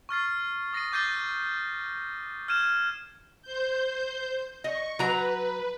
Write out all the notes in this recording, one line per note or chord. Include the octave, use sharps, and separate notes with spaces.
C#6 F6 A6 C7
D#6 A#6 C7 D#7
D6 G6 A6 C7 D#7 G7
F6 G#6 D#7 E7
C5 G6
D#5 C#6
F#3 B4 A#5